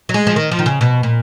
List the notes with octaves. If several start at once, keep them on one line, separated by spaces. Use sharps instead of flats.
F#3
G#3
F3
D#3
F3
D#3
C#3
B2
A#2